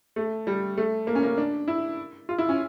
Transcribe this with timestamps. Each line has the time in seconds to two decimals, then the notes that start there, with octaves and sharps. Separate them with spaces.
0.16 A3
0.47 G3
0.77 A3
1.07 A#3
1.15 C#4
1.23 A#3
1.38 D4
1.68 E4
2.29 F4
2.38 E4
2.49 C#4